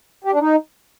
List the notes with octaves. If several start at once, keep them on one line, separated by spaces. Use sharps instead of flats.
G4
D4
D#4